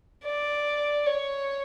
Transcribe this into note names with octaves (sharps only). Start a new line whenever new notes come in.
D5
C#5